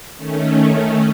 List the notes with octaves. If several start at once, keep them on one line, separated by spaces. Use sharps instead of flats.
D#3 A3 C#4